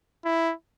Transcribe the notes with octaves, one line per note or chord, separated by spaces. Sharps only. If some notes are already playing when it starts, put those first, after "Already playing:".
E4